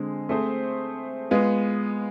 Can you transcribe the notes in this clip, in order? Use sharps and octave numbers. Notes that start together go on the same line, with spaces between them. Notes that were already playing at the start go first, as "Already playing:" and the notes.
Already playing: D3 G#3 C4 G#4
A3 C4 G#4 C5
G#3 B3 F4